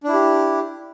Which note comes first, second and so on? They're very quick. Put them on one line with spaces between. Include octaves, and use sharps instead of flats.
D4 E4 G4